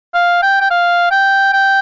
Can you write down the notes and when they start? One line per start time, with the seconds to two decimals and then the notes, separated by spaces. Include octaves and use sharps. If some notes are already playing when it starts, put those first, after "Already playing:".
0.14 F5
0.42 G5
0.60 G5
0.70 F5
1.11 G5
1.53 G5